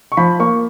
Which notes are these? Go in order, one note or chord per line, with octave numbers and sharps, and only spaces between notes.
C#6
F3 B5
A#3 C#6